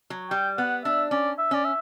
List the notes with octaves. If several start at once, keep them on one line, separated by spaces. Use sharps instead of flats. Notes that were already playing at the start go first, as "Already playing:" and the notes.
F#3
G3 G5
B3 F#5
D4 E5
C#4 D5
E5
C#4 D5
E5